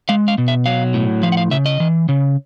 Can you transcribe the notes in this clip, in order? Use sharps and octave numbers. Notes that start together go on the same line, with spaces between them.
G#3 F5
F5
B2
E5
F#3 F5
A2
F3 F5
F#5
F5
C#3 E5
D#5
E3
C#3